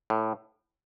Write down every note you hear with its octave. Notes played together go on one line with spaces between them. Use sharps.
A2